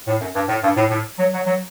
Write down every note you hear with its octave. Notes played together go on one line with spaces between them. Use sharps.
A2
F#2
G2
A2
G2
A2
A2
F#3
F#3
F#3